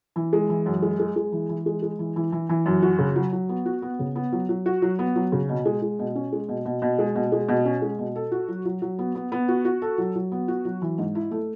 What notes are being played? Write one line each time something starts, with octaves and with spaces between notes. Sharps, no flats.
E3
G#3
E3
F#2
G#3
G#3
G#3
E3
E3
G#3
G#3
E3
E3
E3
E3
F#2
F#4
C#3
F#3
F#3
B3
F#4
B3
C#3
B3
F#3
F#3
F#4
F#3
B3
F#3
C#3
B2
G#3
G#3
B2
C#4
G#3
B2
B2
B2
G#3
B2
G#3
B2
C#4
G#3
B2
A4
F#4
F#3
F#3
F#3
B3
B3
B3
F#4
F#4
A4
F#3
F#3
B3
F#4
F#3
E3
G#2
E4
A3